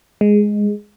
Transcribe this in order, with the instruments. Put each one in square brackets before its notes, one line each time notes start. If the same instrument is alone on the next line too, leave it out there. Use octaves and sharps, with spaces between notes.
[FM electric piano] G#3